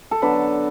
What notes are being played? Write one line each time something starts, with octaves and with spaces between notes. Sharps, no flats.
A4
D3 F#3 B3 D4 B4